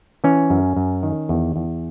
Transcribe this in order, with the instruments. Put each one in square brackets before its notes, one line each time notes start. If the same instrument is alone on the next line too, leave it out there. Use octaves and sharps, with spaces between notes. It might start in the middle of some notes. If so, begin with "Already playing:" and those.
[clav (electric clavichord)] E3 C#4
F#2
F#2
D#3
E2
E2